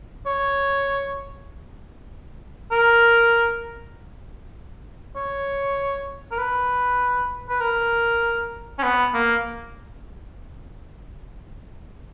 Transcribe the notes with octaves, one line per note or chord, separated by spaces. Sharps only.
C#5
A#4
C#5
A#4
B4
B4
A#4
C#4
B3
A#3